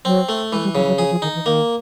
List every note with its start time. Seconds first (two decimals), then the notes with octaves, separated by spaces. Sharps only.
0.05 F#3 C4
0.29 A3
0.53 E3 G#3
0.63 G3
0.75 C#3 F#3
0.87 F#3
0.98 F3 G#4
1.11 F3
1.22 D#3 D#4
1.35 E3
1.46 D#3 A#3